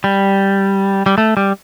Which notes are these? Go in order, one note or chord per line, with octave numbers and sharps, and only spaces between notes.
G3
G3
A3
G3